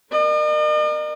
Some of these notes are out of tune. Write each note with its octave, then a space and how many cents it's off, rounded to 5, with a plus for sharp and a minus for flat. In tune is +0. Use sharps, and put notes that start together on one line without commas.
A#4 +5 D#5 -45